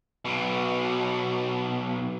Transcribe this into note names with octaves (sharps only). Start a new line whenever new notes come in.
B1 B2